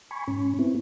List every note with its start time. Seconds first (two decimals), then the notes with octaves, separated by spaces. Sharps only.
0.11 G#5 B5 C#6
0.27 G#2 C#4
0.59 B3 C4 E4